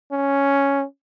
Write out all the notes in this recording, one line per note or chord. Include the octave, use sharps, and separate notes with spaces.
C#4